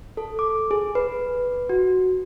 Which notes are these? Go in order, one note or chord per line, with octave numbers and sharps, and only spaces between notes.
A4
D6
G#4
B4
F#4